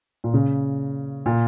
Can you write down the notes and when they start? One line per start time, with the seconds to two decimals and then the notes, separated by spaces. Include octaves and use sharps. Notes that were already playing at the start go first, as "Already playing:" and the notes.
0.24 A#2
0.34 C#3
1.26 A#2